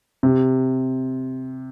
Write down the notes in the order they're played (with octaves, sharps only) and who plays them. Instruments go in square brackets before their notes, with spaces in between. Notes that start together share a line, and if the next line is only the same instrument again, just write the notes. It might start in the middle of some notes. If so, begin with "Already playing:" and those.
[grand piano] C3